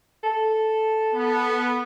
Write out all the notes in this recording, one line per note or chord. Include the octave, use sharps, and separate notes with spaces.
A4
B3